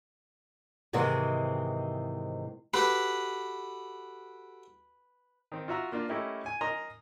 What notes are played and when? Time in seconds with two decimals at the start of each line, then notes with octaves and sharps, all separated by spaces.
0.93 G#2 C3 D#3 E3 G#3 C4
2.74 F#4 G4 A4 B4
5.52 D#3 C4
5.68 F4 F#4 E5 A#5
5.92 A#3 D4 F4
6.09 A3 C#4 D#4 E4 G4 A#4
6.46 G#5
6.61 A#4 D#5 G#5 A#5 C6